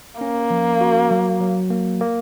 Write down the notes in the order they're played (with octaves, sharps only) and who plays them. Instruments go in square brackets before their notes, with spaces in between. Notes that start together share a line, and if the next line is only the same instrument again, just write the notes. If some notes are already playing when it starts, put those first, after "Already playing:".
[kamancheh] A#3 [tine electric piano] C#4
[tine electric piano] F3
F#4
F#3
F#3
A#3
A#3